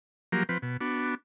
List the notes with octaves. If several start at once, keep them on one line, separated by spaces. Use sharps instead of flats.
F3 F#3 A#3 G4 A#4
F3 C4 B4
B2
B3 D4 F#4